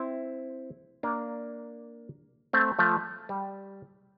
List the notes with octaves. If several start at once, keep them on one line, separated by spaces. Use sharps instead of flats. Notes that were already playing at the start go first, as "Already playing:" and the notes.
Already playing: C4 E4
A#3 D4
A3 C4
F3 A3
G3